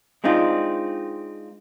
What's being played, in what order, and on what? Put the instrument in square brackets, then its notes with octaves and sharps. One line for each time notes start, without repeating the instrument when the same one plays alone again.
[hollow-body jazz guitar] G#3 C4 D4 D#4 F4